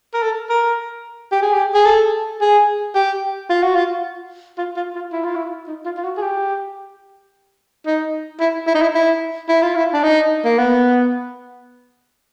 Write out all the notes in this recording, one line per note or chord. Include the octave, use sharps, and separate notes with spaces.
A#4
A4
A#4
G4
G#4
G4
G#4
A4
G#4
G4
F4
F#4
F4
F4
F4
F4
E4
F4
E4
D#4
F4
F4
F#4
G#4
G4
D#4
E4
E4
D#4
E4
E4
E4
F4
E4
D4
D#4
A#3
B3